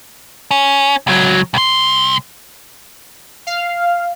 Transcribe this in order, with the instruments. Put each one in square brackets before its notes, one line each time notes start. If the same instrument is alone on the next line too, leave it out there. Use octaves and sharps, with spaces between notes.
[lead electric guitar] C#4
C#2 F#3
C2 C6
[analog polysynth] F5